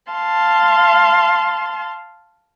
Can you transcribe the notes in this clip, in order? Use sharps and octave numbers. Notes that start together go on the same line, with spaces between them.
F5 A5 C6